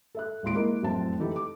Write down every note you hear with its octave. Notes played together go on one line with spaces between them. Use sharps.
A4 E5 F#6
D#1 G#1 E4 C6 D7
G#3 A#3 E4 A#4 D#5
F1 F#2 A2 C4 A5
E3 D#4 G4 A4
D6